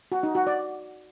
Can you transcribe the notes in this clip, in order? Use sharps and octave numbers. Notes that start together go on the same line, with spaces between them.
F#4
D#4
F#4
D5